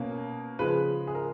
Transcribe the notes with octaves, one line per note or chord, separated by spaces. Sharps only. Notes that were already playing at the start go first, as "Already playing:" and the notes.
Already playing: B2 A#3 C#4
C#3 F3 G#3 B4
G#4
A#4